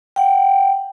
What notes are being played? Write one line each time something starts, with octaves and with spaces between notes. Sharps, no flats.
F#5 G5